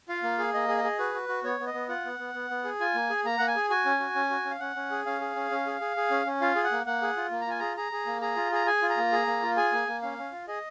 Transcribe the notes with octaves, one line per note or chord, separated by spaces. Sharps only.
F4 F5
A#3
G#4
A#3 D#5
G#4
D#5
G#4
F#4 B4
F#4
F#4
B3 C#5
B3
D#5
B3
F4 F#5
B3
B3
B3
B3
G#4
F4 G#5
A#3
G#4
A#3 A#5
A#3 F#5
G#5
G#4
F#4 G#5
C#4
F#4
C#4
F#4
C#4
F5
C#4 F#5
C#4
G#4
C#4 F5
G#4
C#4
C#4
G#4
G#4
G#4
C#4
C#4
F4 F5
G#4
F#5
A#3
A#3 F#5
G#4
F4
A#3
A#5
F4 G#5
G#4 A#5
G#4 A#5
G#4
A#3
G#4 A#5
F4
G#4 A#5
G#4 G#5
F4
A#5
A#3
G#4
A#3
F4
G#4 G#5
A#3
A#3
C#4 F5
C#4
F4
G#4 D#5